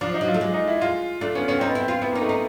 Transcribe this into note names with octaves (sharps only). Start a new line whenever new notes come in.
F3 D4
D#4
F#3
F4
A3
G#3
D#4
E4
G#3 F4
A3 D4
B3 C#4
B3 C#4
C4 D#4
B3
C4 E4
F4
B3 E4
A#3 D#4
A3
D#4